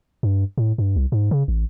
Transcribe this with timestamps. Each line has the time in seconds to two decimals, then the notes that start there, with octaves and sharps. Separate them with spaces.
0.23 G2
0.58 A2
0.78 G2
0.96 C2
1.12 G#2
1.31 C#3
1.48 A1